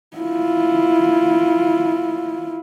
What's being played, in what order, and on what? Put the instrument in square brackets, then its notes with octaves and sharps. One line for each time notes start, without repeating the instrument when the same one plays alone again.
[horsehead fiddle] E4 F4